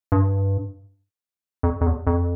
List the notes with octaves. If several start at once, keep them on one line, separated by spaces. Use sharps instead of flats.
G2
F2
F2
E2
F2